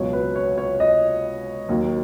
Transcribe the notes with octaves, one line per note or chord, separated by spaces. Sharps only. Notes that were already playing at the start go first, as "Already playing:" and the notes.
Already playing: C#2 B2 F#3 C#5
B4
C#5
C#5
D#5
D#2 D#3 F#3